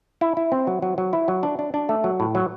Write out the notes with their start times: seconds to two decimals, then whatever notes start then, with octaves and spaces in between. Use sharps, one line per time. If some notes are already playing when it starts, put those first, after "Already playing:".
0.21 E4
0.37 E4
0.52 C4
0.67 F#3
0.82 F#3
0.98 F#3
1.13 E4
1.28 F#3
1.43 D4
1.59 D4
1.74 D4
1.89 A3
2.04 F#3
2.20 A2
2.35 F#3